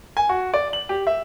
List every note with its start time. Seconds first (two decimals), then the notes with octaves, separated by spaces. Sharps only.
0.17 G#5
0.29 F#4
0.54 D5
0.73 F#7
0.89 G4
1.07 E5